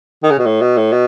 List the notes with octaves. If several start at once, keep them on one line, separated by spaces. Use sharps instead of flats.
D#3
C#3
B2
A2
B2
A2
B2